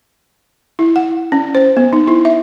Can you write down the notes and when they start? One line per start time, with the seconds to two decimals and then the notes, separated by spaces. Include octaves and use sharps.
0.79 E4
0.96 F#5
1.32 C#4
1.55 C5
1.77 B3
1.93 D#4
2.07 E4
2.25 E5